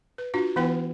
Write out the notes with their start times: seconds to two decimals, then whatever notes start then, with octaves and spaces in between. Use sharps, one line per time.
0.18 B4
0.34 D4 F4 F#4
0.56 E3 B3 E4 B4 G5